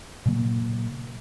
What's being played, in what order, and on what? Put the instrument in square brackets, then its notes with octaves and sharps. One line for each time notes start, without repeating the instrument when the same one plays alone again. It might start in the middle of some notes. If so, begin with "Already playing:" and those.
[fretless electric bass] A#2 C#3 F#3 A#3